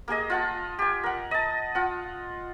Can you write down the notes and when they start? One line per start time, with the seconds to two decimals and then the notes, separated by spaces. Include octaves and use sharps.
0.08 A#3 G4 G#4 D#5
0.30 F4 F#5 A5
0.79 G4 G#5
1.04 A#4 F#5
1.31 D#5 A5
1.75 F4 F#5